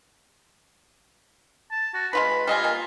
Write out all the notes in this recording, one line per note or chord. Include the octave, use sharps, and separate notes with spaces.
A5
F#4
G#3 F4 B4 B5
G3 F4 D#5 G#5
A#3